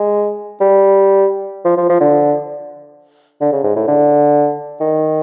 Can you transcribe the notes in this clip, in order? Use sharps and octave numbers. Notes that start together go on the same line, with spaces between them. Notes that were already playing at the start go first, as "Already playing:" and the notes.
Already playing: G#3
G3
F3
F3
F3
D3
D3
C#3
G#2
A2
D3
D#3